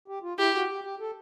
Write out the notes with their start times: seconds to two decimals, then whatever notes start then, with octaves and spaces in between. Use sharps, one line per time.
0.08 G4
0.23 F4
0.38 E4 G4
0.54 F#4
0.69 G4
0.85 G4
1.00 A4